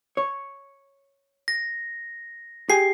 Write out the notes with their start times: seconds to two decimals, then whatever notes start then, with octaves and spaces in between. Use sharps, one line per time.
0.17 C#5
1.48 A#6
2.70 G4 G#4 G#5 C7